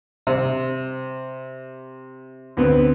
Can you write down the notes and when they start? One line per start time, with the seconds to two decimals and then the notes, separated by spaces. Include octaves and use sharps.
0.27 C3
2.57 D2 B3 C4